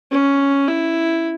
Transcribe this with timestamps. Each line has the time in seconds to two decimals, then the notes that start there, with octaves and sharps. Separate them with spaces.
0.12 C#4
0.68 E4